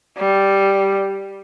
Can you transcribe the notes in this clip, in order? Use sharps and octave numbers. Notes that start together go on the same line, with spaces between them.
G3